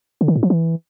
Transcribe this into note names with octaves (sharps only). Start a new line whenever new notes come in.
D3
D#3
A2
F3
E3